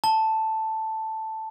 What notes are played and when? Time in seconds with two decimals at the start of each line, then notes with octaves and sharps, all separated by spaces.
0.04 A5